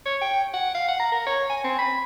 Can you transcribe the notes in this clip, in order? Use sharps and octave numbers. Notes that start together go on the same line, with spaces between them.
C#5
G5
F#5
F5
F#5
A#5
A#4
C#5
G#5
C4
B5